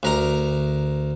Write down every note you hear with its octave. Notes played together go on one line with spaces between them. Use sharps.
D2 A#4 A#5